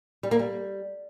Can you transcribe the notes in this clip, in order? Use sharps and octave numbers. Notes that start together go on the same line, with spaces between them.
G3
A#3
G3